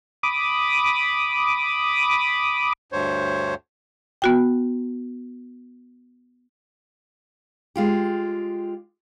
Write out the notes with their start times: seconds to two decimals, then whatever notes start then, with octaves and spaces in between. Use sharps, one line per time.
0.23 B5 D6 D#6
2.92 D2 G2 C5 C#5
4.22 B3 F#4 G5
7.76 G#3 F4 G4